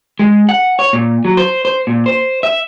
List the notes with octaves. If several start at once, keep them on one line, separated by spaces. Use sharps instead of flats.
G#3
F#5
C#5
A#2
F#3
C5
C5
A#2
C5
E5